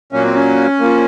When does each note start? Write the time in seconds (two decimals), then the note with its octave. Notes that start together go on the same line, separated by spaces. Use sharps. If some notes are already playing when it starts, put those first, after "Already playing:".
0.12 A#2 F#3 A#3 C#4
0.24 C4
0.35 C#4
0.80 F3 A#3